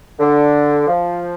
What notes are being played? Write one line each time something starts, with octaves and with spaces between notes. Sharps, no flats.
D3
F3